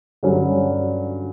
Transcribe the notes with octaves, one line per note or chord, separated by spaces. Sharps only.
G2 D3 F#3 C#4